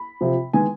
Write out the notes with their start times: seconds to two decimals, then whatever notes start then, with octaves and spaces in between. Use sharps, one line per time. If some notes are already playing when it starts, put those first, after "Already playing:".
Already playing: B5
0.21 C3 F3 C4
0.53 D#3 G#3 B3 G#5